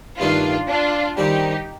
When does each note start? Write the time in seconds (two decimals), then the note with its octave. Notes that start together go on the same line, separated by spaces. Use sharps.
0.19 G2 D#3 A3 D4 D#4 F4
0.68 D4 F4
1.17 D#3 G3 C4 D#4 G4